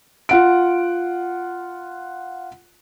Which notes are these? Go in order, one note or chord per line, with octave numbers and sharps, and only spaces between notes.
F4 F#5 D7